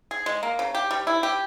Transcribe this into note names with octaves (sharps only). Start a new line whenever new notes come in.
G#4
G#3
A#3
C#3
G4
G3
E4
G4